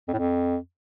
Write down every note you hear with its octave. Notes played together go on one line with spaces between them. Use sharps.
F2
A2
F2